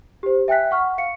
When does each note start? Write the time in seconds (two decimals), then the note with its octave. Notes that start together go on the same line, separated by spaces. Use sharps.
0.23 G4 C5
0.48 E5 G5 G#5 F#6 B6
0.71 F#5 C#6 F6
0.98 F5 C#7